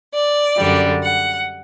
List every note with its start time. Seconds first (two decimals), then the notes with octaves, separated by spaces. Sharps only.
0.13 D5
0.58 F#2 D3 G3
1.03 F#5